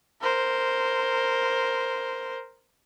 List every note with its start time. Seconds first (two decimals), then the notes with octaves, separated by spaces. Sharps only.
0.21 A#4 C5